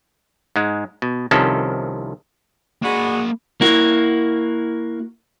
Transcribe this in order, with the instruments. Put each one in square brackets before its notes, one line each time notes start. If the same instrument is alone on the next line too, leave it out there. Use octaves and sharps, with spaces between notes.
[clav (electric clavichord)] G#2 G#3
B2
C2 C3 D#3 F3 C#4 A4
[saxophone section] G#3 D4 F#4 [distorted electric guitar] A#3 B5
[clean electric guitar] A#3 E4 F#4